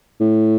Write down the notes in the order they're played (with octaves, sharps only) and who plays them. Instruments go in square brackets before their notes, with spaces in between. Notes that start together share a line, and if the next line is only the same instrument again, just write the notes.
[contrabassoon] A2